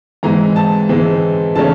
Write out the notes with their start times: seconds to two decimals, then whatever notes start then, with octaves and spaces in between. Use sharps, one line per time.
0.23 G#2 E3 G#3 C4 A#5
0.56 A5
0.89 G#2 E3 G#3 C4
1.55 C#3 E3 A3 C#4 A5